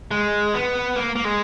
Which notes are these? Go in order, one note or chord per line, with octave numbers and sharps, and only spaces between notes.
G#3
B3
A#3
A#3
G#3